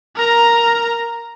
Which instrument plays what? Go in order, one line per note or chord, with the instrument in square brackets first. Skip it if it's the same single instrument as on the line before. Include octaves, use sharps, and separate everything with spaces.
[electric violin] A#4 A#5